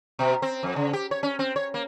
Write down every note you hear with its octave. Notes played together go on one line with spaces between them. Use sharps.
B2
C4
F2
C#3
G4
C#5
C#4
C4
C#5
A#3